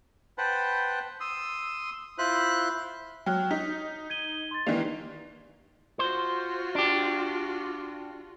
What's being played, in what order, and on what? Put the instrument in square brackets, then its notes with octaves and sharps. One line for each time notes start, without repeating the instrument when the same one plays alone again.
[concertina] B4 C5 F#5 G5 A5 B5
C6 D#6 E6
E4 F4 C5 B5 F#6
[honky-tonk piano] F#3 [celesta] G5 F6 F#6
[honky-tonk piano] D#4 [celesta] B6
[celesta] G#6 D#7 G7
C6 A6
[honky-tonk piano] D#3 E3 A#3 [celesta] G4 D5 F7
[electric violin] F4 F#4 [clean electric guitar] C5
[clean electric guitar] D4 G4